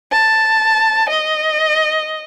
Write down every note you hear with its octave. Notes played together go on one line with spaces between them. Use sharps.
A5
D#5